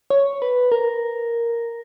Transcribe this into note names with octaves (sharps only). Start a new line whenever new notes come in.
C#5
B4
A#4